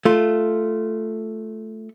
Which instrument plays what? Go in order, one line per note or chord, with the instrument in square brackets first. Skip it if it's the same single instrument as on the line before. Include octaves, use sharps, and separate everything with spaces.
[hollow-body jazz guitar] A3 F4